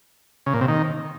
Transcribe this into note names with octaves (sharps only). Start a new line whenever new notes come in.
C#3
A#2
C3
D#3